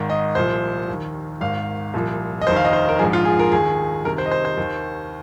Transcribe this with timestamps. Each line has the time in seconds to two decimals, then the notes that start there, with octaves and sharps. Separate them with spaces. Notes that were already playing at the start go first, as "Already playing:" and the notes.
Already playing: G#1 G#2 D#3
0.10 D#5
0.35 C2 A#2 F3 C5
0.88 D#2
0.93 D#3
1.41 G#1 G#2 D#3 F5
1.94 C2 A#2 F3
2.41 D#5
2.47 F1 D#2 D#3 C5
2.56 F5
2.65 D#5
2.73 C5
2.89 A#4
2.99 F3 G#4
3.02 A#1 G#2
3.13 F4
3.25 G#4
3.39 A#4
3.52 D#2 D#3 G#4
4.04 C2 C3 D#3 A#4
4.18 C5
4.26 D#5
4.31 C5
4.45 C5
4.57 D#2 D#3